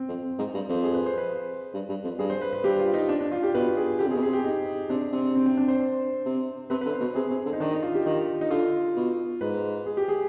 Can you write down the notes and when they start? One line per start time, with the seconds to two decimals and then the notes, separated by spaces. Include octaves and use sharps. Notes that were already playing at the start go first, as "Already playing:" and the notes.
Already playing: C4
0.08 F2
0.38 G#2
0.54 G2
0.69 F2
0.84 G#4
0.94 B4
1.06 C5
1.18 B4
1.73 G2
1.89 G2
2.03 F2
2.19 G2 G#4
2.30 C5
2.41 B4
2.53 B4
2.64 G2 G4
2.79 F4
2.94 D#4
3.09 D4
3.21 D4
3.32 F4
3.43 G4
3.54 B2 B4
3.77 G#4
3.99 D3 G4
4.07 C3
4.11 G#4
4.14 B2
4.22 C3 G#4
4.33 G4
4.44 D#4
4.90 C3 D4
5.12 C3
5.35 C4
5.46 C4
5.57 D4
5.68 C5
6.25 C3
6.70 C3 B4
6.81 B4
6.85 D3
6.93 C5
7.00 B2
7.04 B4
7.15 C3 G#4
7.30 C3
7.45 D3
7.53 D#4
7.60 D#3 D4
7.71 D#4
7.83 F4
7.94 G4
8.06 D#3
8.41 D#4
8.50 D3 F4
8.96 B2
9.41 G#2 B4
9.86 G#4
9.97 G4
10.08 G#4